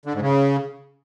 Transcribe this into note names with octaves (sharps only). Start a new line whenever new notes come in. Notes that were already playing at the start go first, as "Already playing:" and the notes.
D3
G#2
C#3